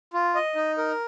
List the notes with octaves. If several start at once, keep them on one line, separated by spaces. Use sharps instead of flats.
F4
D#5
D#4
A#4